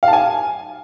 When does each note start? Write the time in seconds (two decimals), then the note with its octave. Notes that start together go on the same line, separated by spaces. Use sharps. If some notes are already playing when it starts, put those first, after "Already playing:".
0.03 F5
0.08 A5
0.13 G#5